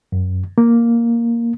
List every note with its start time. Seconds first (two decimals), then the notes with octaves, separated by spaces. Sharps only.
0.12 F#2
0.58 A#3